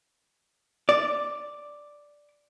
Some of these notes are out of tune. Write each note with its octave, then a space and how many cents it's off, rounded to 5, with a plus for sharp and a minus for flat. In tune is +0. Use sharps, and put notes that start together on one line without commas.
D5 +0